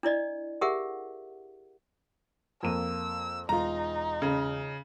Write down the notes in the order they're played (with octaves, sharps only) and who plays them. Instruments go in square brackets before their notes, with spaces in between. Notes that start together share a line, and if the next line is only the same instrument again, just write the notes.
[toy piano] D4 E4 D5 D#5
G4 G#4 A#4 E5 F#5
[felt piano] F2 A#3 D#7 [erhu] E6
[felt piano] E1 F4 [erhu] D#4 [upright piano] A#5
[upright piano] C#3